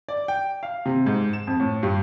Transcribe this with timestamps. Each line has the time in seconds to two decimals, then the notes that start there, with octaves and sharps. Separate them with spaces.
0.08 D5
0.28 G5
0.63 F5
0.86 C3
1.06 G#2
1.33 E7
1.47 F2
1.60 A2
1.83 G2